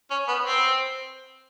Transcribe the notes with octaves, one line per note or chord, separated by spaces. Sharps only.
C#4
B3
C4